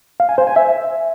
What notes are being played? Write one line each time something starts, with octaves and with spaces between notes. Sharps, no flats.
F5
G#5
C5
G#5
E5